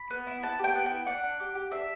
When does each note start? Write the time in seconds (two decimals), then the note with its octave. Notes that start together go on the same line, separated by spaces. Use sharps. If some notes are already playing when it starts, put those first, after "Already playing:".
Already playing: B5
0.10 B3
0.27 E4
0.43 B3 A5
0.59 G4 G5
0.75 B3
0.86 E4 G5
1.07 D4 F#5
1.23 D4
1.40 G4
1.55 G4
1.72 D4 E5